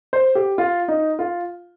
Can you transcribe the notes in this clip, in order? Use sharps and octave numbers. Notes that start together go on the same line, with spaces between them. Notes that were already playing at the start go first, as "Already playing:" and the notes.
C5
G4
F4
D#4
F4